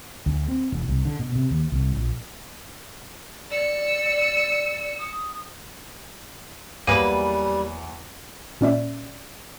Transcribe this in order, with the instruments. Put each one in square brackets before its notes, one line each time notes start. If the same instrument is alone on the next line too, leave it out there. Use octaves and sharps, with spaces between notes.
[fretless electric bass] D2
C4
E1
C2
D3
B2
C3
D#2
C2
A#1
[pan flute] D5 [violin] E6 C#7
[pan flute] D#6
[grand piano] E2 F#3 [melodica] G3 [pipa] A#3 G#4 B4 [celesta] D#7
[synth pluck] A#2 C#4 D5 E5